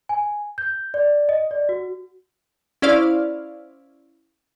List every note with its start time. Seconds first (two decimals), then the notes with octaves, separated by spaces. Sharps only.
0.09 G#5
0.58 G6
0.94 D5
1.29 D#5
1.51 D5
1.69 F#4
2.82 C#4 E4 C5 D5 F5 F6